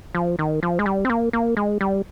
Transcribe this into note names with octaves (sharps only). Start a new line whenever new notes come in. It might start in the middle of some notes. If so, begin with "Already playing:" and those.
F3
D#3
F3
G#3
G3
C4
A#3
A#3
G#3
G3